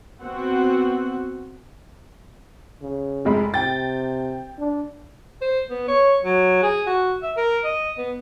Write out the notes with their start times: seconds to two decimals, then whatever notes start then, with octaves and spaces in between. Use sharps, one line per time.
0.22 B3 C4 F#4 F#5
2.81 C#3
3.25 F1 G#3 B5
3.54 C3 G5 A6
4.59 D4
5.41 C5
5.70 B3
5.88 C#5
6.23 F#3
6.63 G#4
6.87 F#4
7.23 E5
7.37 A#4
7.64 D#5
7.98 B3